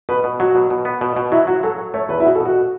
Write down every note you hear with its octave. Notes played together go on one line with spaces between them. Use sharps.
B2 B4
B2
F#3 F#4
B2
B2
B3
B2
B2
F#3 E4
F#3 F#4
F#3 A4
F#3
A3 C#5
E2 B4
E4
B2 F#4
A4
B2
F#4